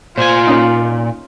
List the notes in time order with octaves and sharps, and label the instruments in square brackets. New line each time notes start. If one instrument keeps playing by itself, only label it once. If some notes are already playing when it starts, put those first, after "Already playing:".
[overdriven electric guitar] A#2 G#5 [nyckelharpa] F4 [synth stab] C5
[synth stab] A#3 C#4 D#4